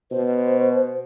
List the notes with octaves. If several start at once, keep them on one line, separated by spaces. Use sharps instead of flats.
B2 C5